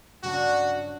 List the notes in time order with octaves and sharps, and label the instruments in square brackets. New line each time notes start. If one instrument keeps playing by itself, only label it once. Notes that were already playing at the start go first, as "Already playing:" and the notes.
[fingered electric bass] G2 C#3 [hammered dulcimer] F#3 D4 C#6 [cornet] F#4